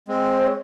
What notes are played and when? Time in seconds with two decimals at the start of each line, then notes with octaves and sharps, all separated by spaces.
0.08 G#3 C4
0.23 C5
0.46 C#5